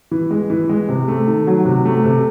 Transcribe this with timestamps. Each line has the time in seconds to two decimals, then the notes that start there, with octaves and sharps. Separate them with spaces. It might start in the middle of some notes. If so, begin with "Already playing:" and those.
0.11 E3
0.31 G#3
0.50 E3
0.69 G#3
0.89 C3
1.08 A3
1.28 D#3
1.47 F#3
1.65 C3
1.85 A3
2.04 C3